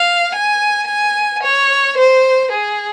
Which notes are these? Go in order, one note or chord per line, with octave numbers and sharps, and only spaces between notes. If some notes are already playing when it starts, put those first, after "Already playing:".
Already playing: F5
G#5
G#5
C#5
C5
G#4